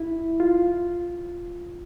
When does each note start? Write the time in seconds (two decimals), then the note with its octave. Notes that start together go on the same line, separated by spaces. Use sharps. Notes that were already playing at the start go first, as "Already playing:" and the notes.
Already playing: E4
0.40 F4